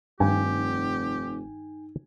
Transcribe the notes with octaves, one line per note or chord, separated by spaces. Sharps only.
F1 G2 D#3 G4 G5 G#5